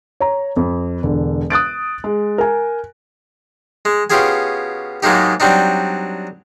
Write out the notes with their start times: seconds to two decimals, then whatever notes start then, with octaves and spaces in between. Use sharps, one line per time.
0.20 C#5 A#5
0.56 F2
1.03 E1 D3
1.50 D#6 F#6 A6 D7
2.04 G#3
2.38 A#4 G#5
3.85 G#3
4.10 B2 C#4 F4 G4 G#4 G#5
5.03 G#2 F#3 G#3 A#3 D#4 G4
5.40 F#3 G3 C4 D4 D#4